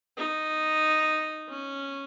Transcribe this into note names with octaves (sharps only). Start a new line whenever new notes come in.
D#4
C#4